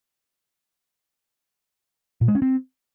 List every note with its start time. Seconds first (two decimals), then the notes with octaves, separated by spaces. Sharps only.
2.21 A#2
2.28 G#3
2.35 C#4
2.42 C4